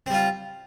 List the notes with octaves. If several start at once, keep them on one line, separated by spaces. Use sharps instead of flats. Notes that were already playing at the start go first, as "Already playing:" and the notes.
G3 C4 F4